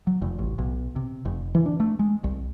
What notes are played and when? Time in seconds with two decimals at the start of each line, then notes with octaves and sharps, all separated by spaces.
0.07 F#3
0.22 F1
0.39 A1
0.58 B1
0.96 C3
1.25 F1
1.55 E3
1.66 D4
1.80 A3
1.99 G#3
2.24 C2